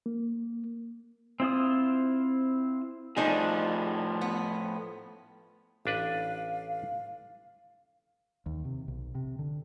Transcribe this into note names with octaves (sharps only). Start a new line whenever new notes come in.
A#3
C4 E4 F4 D#6
A2 F3 D4 D#4 G#4
B3
A1 D4 B4 F5
D#2
C3
B1
C3
D3